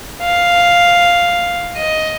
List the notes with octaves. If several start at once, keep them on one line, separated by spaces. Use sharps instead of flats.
F5
D#5